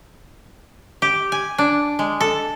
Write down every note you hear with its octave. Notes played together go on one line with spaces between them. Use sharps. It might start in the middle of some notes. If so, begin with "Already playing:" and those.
G4
G#5
D4
G#3
A4